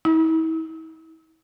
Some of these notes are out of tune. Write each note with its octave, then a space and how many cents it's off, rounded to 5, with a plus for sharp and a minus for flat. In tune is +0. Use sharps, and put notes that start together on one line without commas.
E4 -40